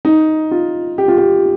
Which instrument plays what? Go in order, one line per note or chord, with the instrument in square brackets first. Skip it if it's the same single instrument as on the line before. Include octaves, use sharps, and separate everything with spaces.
[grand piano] D#4
F4
G4
F4
G4